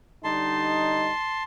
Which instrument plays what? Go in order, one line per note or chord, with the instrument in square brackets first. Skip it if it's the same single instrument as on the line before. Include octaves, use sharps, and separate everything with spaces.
[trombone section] D3 G3 D#4 [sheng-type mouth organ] A5 C6